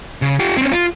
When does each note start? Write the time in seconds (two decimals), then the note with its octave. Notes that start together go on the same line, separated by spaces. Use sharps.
0.22 C#3
0.39 F4 G4
0.57 C4 C#4
0.72 F4